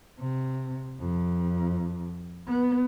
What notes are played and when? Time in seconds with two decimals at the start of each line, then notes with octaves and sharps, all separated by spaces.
0.19 C3
1.00 F2
2.48 B3